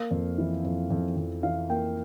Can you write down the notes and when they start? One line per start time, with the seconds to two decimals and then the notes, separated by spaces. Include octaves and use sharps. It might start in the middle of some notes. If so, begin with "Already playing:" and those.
Already playing: A#3 F5
0.11 F2
0.38 E3
0.64 F2
0.90 F2
1.16 F2
1.43 E3 F5
1.69 A#3 G5